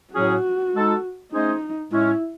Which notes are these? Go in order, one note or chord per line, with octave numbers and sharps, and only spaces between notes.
A2 F#3 C#4 F#4 G#4
G#3 D#4 A4
A3 C#4 D#4 G#4 C5 D#5
A2 G#3 C#4 E4